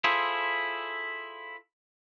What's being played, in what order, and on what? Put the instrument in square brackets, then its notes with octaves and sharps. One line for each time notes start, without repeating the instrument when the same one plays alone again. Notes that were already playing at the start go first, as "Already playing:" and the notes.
[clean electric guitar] E4 F4 G#4 A4 C5